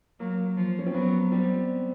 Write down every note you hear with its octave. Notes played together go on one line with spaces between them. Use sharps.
F#3 A#3
F3
C#4
C4
F#3 B3
G3 C4